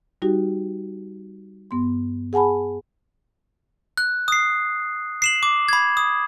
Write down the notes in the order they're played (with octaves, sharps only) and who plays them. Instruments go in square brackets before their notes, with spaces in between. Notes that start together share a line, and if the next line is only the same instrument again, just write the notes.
[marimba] G3 D#4 F#4 G4
G2 B3 C6
G#4 F#5 G#5 A5 B5
[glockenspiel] F#6
D#6 C7
C7 E7 F#7
D6
B5 G#6
D#6